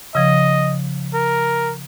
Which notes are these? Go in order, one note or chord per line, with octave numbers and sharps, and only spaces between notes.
C#3 F3 D#5
A#4